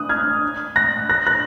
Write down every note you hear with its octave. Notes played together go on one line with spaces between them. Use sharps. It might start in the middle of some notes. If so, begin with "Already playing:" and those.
Already playing: D#6 F#6
F6 G#6
F#6 A#6
F#6 A#6
F#6 A#6